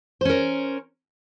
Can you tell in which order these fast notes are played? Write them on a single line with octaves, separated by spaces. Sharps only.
C5 C#4 A#4